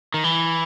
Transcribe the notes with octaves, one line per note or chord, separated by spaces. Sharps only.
D#3
E3